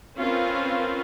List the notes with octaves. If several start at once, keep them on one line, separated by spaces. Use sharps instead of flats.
C4 C#4 F4 A#4 B4